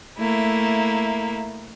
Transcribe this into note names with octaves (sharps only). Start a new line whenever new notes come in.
A3 A#3 E4